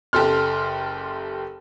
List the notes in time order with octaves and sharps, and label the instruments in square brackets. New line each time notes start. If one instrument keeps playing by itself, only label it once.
[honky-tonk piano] F#1 G4 A4 C6 F6